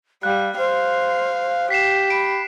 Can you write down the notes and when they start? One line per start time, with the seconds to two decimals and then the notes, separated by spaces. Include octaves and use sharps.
0.23 G3 F5 F#6
0.57 C5 F5
1.70 G4 B6 C7 E7
2.10 B5 D7